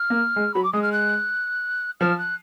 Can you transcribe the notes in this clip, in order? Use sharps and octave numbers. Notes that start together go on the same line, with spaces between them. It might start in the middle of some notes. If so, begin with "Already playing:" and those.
Already playing: F6
A#3
G#3
F#3 B5
D6
G#3 D#6
F6
F#6
F3 F6
F#6